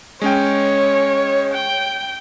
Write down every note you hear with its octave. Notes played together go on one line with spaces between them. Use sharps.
G#3 C#4 C#5 G5
G5